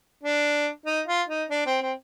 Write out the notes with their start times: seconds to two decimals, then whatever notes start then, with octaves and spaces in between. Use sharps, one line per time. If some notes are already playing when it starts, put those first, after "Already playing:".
0.23 D4
0.86 D#4
1.07 F4
1.29 D#4
1.50 D4
1.66 C4
1.81 C4